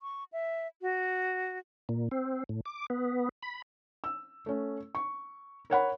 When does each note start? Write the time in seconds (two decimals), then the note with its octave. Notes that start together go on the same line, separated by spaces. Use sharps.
0.02 C#6
0.33 E5
0.82 F#4
1.89 A#2
2.11 C4
2.49 A2
2.65 D6
2.90 B3
3.43 B5
4.04 E6
4.46 A3 C#4
4.95 C#6
5.70 A#4 C#5 F#5 B5